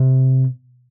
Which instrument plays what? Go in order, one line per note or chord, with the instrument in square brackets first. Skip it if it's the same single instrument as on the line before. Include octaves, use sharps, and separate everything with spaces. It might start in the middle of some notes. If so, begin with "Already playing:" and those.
Already playing: [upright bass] C3